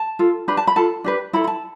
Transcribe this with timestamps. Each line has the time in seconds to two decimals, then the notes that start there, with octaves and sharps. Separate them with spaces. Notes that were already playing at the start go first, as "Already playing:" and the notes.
Already playing: A5
0.19 F4 A4
0.48 D4 G4 B4 B5
0.57 A5
0.67 B5
0.76 F4 A4 A5
1.04 D4 G4 B4
1.33 E4 A4 B5
1.44 B5
1.47 A5